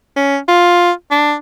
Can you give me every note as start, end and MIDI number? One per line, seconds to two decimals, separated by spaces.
0.16 0.38 61
0.48 0.91 65
1.11 1.34 62